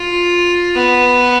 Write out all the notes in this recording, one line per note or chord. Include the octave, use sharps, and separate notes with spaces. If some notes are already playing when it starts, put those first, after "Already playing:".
Already playing: F4
B3